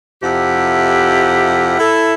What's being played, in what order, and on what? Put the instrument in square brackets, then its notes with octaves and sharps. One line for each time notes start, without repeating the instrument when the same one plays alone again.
[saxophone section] F2 C3 E4 G4 F#5
E4 A4